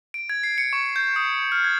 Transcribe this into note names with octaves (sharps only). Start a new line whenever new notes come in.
D7
G#6
C7
C#7
C#6
G6
D#6
F6
G#6